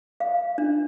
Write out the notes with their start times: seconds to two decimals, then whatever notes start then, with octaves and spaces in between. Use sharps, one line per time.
0.20 F5
0.58 D4